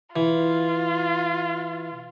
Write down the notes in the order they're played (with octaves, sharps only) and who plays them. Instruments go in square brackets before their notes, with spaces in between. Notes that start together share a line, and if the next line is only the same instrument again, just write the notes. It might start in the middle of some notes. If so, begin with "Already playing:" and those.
[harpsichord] E3 [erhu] F4